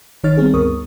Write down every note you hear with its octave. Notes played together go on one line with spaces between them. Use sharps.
G1 D#3 D#4 C#5 F6 A6
G3 B3 C4 G#4
D2 G2 A#4 C#6 D#6